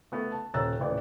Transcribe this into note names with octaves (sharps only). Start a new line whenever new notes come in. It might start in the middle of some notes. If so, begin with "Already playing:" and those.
A3 B3
A5
D#1 C#4 A#5 E6 F#6 A6
D#1 A1 D5